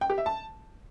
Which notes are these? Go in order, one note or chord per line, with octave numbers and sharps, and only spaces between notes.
G5
G4
E5
A5